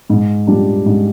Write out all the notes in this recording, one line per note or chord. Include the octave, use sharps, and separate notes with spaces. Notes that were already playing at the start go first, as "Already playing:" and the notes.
G#2
G3 D4 F4
G#2